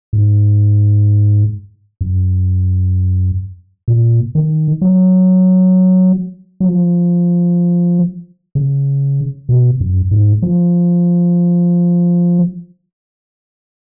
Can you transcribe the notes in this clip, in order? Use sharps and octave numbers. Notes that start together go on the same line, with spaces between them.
G#2
F#2
A#2
D#3
F#3
F#3
F3
C#3
B2
F#2
G#2
F3